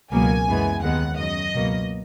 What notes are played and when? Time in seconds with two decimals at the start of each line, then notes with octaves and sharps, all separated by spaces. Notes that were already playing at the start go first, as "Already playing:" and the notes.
0.12 C#2 B2 F#3 A#3 G#5
0.48 F#2 E3 G#3 B3
0.83 D#2 D#3 G#3 B3 F#5
1.17 F#2 C#3 F#3 D#5
1.53 C#2 B2 F#3 A#3